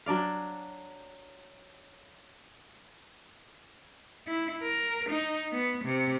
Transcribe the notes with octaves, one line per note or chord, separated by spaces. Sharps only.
F#3 D4 D5 F5
E4
A#4
D#4
B3
C3